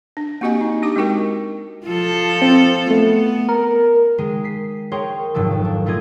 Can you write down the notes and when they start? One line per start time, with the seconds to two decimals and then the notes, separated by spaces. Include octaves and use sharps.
0.17 D4
0.41 A#3 C4 F#4 G4 D#5 G#5
0.61 D#4
0.82 D4 G4 D6
0.96 G#3 C4 D#4 F#4 A#4 G5
1.87 F3 F4 A4
2.42 C4
2.90 A3 B3
3.49 A#4
4.18 D#3 G#3 G#4
4.44 B6 C7
4.92 G#4 A#4 C5 C#5 G5 C6
5.34 F1 G#2 D#3 F#3 A4
5.65 D4
5.86 A#2 A3 D4 F4 D#5 G#6